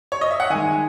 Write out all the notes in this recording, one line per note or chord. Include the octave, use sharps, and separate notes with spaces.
C#5
D#5
E5
F#5
D#3 G#3 G#5